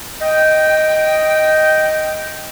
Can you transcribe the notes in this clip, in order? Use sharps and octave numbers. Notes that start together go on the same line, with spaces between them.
D#5 G5